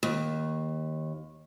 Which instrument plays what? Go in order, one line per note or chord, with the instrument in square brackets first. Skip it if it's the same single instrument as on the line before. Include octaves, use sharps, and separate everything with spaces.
[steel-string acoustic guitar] D#2